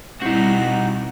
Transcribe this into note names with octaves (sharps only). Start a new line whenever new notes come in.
B2 G3 C4 D#4 E4 F#4